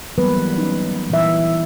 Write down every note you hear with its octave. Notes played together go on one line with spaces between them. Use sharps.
E3 F#3 G3 A#3 B3 B4
C#4 D#4
A#2 E3 E5